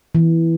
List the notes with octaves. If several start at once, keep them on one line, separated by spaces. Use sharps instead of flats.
E3